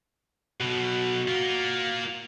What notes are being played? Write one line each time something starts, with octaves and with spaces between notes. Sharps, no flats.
B1 B2 F#4
A#3 F4